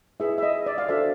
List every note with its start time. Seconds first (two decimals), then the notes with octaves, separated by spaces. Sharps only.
0.20 E4 G#4 B4 E5
0.38 E5
0.43 D#5
0.66 D5
0.78 F5
0.89 D4 F#4 A4 C5 E5